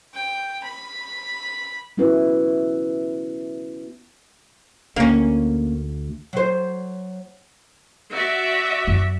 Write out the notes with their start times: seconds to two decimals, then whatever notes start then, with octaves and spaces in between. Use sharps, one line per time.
0.14 G5
0.63 B5
1.97 B3 C#4 E4 F#4 B4
4.96 D2 A#3 C#4
6.33 F#3 C5
8.11 F#4 D5 E5
8.88 F#2